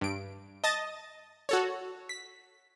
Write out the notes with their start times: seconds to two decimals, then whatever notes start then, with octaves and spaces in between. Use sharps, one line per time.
0.01 G2 D7
0.64 D#5 A5 D#6 A6 A#6
1.49 F#4 A4 C#5
2.09 B6